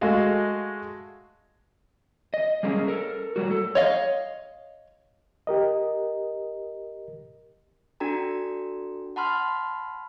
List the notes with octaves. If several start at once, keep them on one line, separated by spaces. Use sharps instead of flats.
G#3 A3 F#4 D#5 F5
D#5
G3 G#3 A#3 C4 C#4 G#4
A4 A#4
A2 F#3 G3 F#4
A4
C#5 D#5 F5
G4 A#4 D#5
D4 F#4 A4 G5 A#5
F#5 A5 B5 C6 F6